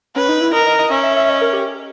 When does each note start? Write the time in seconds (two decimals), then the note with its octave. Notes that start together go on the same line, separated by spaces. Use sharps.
0.16 C#4 B4
0.29 D#4
0.41 E4
0.53 A#4 D#5
0.67 D#5
0.79 D#5
0.91 C#4 E5
1.03 E5
1.16 E5
1.29 D#5
1.41 A#4
1.53 G4